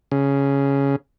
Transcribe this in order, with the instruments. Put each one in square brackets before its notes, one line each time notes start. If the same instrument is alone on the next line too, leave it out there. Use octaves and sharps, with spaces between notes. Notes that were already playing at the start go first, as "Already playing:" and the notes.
[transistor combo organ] C#3